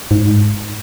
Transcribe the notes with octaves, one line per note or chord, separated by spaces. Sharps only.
G#2